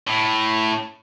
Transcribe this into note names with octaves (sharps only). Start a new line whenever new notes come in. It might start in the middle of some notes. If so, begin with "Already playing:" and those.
A2